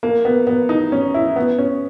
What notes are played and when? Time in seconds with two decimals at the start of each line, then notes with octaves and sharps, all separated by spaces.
0.03 A#3
0.25 B3
0.47 B3
0.69 D#4
0.92 C#4
1.14 E4
1.36 B3
1.58 C#4